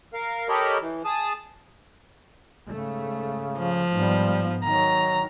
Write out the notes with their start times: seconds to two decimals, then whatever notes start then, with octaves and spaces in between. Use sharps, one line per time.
0.14 A#4 F5
0.49 G4 A4 A#4 C#5 D#5 B5
0.81 E3
1.05 G#4 A5 D#6
2.67 G#2 C#3 A3
3.59 F3
3.92 G#2 G3 B3
4.65 D#3 F#3 A#5